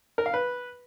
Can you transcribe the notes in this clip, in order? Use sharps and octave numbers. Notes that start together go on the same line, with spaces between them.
A#4
F5
B4